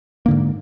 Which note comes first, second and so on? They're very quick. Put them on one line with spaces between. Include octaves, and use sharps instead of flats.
A#3 D3 G#2